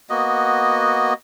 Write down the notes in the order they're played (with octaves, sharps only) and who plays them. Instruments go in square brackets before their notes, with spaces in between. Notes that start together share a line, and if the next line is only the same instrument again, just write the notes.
[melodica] A#3 B3 F#4 D#5